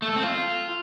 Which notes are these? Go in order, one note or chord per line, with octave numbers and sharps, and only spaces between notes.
A3
A4
C4
F4